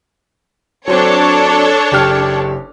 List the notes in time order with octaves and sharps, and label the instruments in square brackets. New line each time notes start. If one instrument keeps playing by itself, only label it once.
[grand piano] F#3 C4 [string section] D4 A4 C#5
[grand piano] F#1 G4 F6